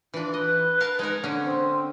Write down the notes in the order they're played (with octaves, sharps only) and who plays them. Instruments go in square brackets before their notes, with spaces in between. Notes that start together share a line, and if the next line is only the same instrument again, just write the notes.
[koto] E3 D4 [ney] F4
[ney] B4 [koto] D#5
[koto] A#4 F5 A5
G#3 D#4 A#4
D3 A#3 C#4
[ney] C4